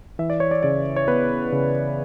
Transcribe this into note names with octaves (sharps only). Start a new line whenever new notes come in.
E3 E5
D5
C#5
D5
C#3 D5
C#5
B3 B4
C#3